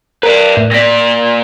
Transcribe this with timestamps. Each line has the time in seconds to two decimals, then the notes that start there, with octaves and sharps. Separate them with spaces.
0.23 A#4 B4 D5
0.57 A2
0.71 A#2 D5 A#6 B6